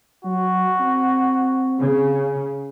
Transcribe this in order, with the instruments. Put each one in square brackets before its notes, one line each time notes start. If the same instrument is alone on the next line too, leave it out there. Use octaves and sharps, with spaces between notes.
[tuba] F#3 [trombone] F#4
[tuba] C4
[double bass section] C#3